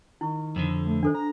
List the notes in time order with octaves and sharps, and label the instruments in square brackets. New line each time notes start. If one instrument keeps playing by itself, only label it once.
[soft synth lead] D#3 [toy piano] E4 C#6
[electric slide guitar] F2 D3
[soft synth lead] A3
[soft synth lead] D#3 [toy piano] D4 A4 C5
[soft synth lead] A#5